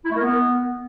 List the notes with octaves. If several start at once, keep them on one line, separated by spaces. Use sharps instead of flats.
E4
A3
A#4
B3